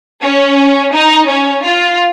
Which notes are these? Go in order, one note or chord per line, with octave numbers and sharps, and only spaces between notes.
C#4
D#4
C#4
F4